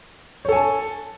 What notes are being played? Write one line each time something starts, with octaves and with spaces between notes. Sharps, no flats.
A4 C#5 G#5 A5